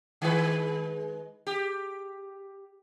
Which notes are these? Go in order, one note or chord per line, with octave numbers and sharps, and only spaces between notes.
D#3 G#3 B4
G4